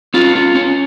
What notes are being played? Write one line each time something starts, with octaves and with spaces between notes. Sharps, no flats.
C#4 F4
F4
C#4